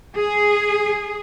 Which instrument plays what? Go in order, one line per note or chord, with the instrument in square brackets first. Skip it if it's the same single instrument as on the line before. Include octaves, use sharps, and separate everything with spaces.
[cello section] G#4